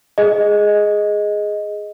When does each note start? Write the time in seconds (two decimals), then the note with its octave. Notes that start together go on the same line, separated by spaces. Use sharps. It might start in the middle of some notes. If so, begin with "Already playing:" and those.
0.18 G#4 D#5